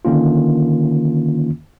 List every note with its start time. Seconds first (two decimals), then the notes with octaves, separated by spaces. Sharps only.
0.05 D3 D#3 A#3 C#4 F4